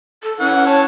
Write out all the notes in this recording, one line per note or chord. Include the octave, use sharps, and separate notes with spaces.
A4
E3 C#4 F#5
C#5 A5